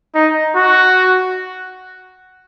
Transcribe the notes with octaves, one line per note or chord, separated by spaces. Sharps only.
D#4
F#4